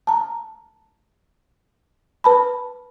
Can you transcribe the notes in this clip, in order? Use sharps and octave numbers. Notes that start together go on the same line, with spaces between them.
A5 A#5
B4 A5 B5